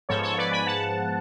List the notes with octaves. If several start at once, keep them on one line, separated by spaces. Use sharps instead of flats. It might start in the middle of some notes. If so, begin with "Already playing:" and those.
G#2 F3 B3 A4 C#5
A4 C#5
B4 D5
G#5 B5
F#5 A5